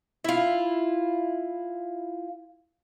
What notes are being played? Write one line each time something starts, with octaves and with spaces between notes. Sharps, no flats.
E4 F4